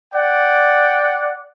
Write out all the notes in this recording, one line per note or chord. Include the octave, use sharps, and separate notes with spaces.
D5 F#5 G5